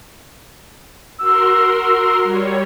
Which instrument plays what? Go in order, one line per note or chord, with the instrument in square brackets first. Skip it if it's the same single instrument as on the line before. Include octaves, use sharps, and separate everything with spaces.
[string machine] F#4 A#4 C6 [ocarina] E6
[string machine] G3 C#5